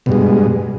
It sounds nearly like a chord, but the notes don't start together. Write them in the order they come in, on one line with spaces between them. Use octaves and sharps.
B2 G2 G#3